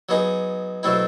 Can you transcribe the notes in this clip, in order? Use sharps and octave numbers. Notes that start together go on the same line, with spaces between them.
F#3 B3 D#4 G#4
B2 F#3 A3 C4 E4